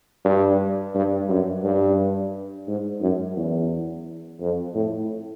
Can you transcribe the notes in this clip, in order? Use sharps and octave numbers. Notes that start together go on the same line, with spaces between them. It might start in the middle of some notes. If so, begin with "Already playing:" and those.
G2
G2
F#2
G2
G#2
F#2
E2
F2
A2